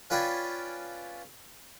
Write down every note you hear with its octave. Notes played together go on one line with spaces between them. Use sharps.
C#4 F4 B4 D5 G5 G#5